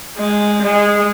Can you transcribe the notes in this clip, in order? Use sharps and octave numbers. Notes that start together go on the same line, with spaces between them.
G#3
G#3